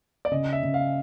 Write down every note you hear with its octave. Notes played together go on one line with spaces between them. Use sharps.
D5
C#3 D#5
E5
C#3
F5